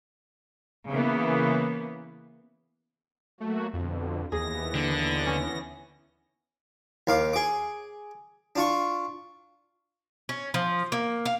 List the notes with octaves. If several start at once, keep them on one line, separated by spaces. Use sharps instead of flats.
C#3 E3 A#3 B3
F#3 A3 A#3 F#4
F2 B2 D3
D#2 E3 B3 G#4 A#6
D3
C#4
D#2 F5 D6
G#4 D6
D4 F4 C#6
C#4
F3
A#3
F5